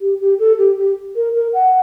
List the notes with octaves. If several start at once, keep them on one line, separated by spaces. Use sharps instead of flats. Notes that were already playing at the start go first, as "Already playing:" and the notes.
G4
G4
A4
G4
G4
A#4
A#4
F#5